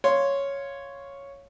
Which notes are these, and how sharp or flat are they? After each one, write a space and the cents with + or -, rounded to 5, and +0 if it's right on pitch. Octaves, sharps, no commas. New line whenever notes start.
C#5 +0 F5 +0 C6 +0